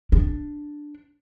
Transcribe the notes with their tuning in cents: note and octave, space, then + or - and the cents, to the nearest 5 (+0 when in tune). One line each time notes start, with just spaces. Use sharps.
D4 +5